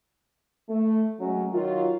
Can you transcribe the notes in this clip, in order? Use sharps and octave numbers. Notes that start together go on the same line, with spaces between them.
A3
F#3 G#3 A3 C#4
D#3 F#3 F4